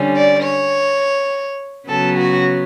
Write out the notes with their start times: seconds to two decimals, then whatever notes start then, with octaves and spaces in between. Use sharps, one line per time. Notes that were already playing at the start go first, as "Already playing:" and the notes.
Already playing: D3 G3 C#4
0.17 D5
0.45 C#5
1.89 C#3 F#3 B3 A4
2.18 F#4